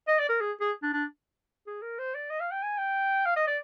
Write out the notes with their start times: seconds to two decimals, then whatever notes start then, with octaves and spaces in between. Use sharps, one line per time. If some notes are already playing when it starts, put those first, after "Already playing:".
0.08 D#5
0.19 D5
0.29 A#4
0.41 G#4
0.61 G#4
0.83 D4
0.93 D4
1.67 G#4
1.82 A#4
1.98 C5
2.15 D5
2.30 D#5
2.40 F5
2.51 G5
2.63 G#5
2.78 G5
3.26 F5
3.36 D#5
3.47 D5